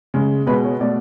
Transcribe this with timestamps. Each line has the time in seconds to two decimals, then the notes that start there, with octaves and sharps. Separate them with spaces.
0.14 C#3 G#3
0.47 B2 G#3 B4
0.64 C#5
0.80 B2 A3 D5